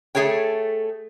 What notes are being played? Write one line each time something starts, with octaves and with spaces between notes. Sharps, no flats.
A3 G#4 A4 C#5 G5